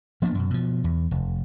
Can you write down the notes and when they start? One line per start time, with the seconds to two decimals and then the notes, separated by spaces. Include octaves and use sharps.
0.22 F3 A#3 B3 D4
0.35 F#2 B2
0.50 B2 F3
0.84 E2
1.11 F1